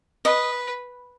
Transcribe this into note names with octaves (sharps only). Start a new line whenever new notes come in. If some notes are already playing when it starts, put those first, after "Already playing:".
B4 D#5